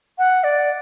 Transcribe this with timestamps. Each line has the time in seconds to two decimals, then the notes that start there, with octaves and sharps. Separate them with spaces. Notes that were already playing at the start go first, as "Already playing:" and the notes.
0.18 F#5
0.44 D5